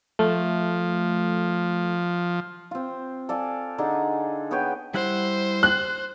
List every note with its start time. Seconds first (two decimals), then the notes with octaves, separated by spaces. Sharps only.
0.19 F3 A3
2.71 C4 F4
3.29 A4 D5 F5 G#5
3.78 D3 D4 D#4 G#4
4.51 B3 G#4 C#5 G5
4.94 G3 E4 C5 F#5
5.63 F#6